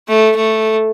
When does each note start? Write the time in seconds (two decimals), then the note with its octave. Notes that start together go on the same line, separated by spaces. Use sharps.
0.09 A3
0.36 A3